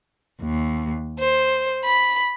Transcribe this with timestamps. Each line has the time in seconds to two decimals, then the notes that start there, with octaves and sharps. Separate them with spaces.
0.40 D#2
1.19 C5
1.84 B5